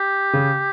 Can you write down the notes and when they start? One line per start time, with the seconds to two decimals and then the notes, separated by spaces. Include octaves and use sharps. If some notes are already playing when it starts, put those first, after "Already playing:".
Already playing: G4
0.33 C#3